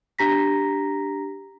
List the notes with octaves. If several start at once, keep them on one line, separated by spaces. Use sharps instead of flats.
D4 G4 A#5 A#6 B6